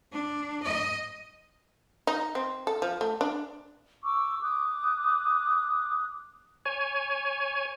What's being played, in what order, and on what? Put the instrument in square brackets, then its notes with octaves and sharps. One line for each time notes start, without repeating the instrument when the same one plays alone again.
[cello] D4
D#5
[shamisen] D#4
C4
A4
F3
A3
D4
[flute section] C#6 D6 E6
D6 D#6 F#6
[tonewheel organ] C#5 G#5